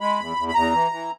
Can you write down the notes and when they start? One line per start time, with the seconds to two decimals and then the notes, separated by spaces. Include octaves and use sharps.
0.01 G#3 B5
0.20 E2
0.37 E2
0.48 B5
0.54 E2 A#5
0.72 E3
0.91 E3